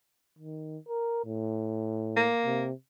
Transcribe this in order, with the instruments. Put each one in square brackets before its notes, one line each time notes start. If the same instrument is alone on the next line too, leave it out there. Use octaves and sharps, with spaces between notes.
[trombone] D#3
A#4
A2
[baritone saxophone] A#3
[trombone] C3